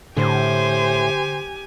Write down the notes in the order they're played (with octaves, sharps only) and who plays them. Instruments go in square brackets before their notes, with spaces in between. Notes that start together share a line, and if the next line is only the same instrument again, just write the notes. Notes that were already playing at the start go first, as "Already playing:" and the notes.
[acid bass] A2 [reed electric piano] D3 [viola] G4 G#5 [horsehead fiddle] C5